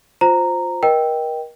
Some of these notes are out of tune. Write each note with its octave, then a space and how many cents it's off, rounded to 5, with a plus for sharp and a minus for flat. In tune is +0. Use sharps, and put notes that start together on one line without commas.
F4 +15 C5 +0 A#5 -10
A#4 +35 D#5 +0 G5 +0